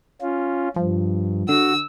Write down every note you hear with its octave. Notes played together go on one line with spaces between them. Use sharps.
C#4 F4
G2 F3
D3 F#4 E6